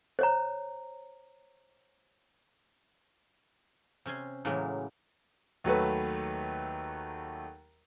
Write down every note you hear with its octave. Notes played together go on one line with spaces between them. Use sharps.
C5 C#5 A#5
C3 C#4 G#5 C6
A2 C#3 E3 F#3 G#3 A#3
D#2 F#3 A3 B4